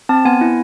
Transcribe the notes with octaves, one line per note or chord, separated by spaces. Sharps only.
C4 A5
B3 G#5
E4